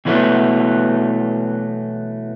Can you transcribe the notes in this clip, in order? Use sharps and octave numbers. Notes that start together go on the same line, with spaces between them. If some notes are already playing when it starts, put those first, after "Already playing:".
B2 E3 F#3 A3 B3